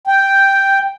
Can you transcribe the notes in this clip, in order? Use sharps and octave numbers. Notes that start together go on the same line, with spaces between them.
G5